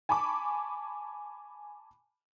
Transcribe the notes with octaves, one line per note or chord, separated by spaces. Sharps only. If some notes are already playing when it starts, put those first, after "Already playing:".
G#5 A5 B5 C#6 D6